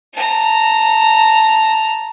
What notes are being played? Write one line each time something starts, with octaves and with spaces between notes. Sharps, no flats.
A5 A#5